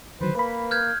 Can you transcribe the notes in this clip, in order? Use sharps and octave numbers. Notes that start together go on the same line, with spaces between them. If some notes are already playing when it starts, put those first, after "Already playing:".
D3 D#3 F#3 B4 C5
A#3 B4 B5
F6 G6 G#6